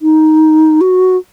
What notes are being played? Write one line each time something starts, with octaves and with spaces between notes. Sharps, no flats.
D#4
F#4